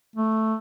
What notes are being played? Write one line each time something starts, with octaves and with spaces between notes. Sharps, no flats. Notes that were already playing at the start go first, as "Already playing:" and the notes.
A3